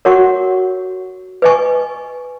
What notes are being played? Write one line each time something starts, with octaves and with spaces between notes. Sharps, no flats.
F#4 A#4 C#5 F#5 C#6
B4 D#5 G#5 C#6